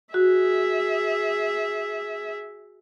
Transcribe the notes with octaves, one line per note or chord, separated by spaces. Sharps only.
F#4 G#4 E5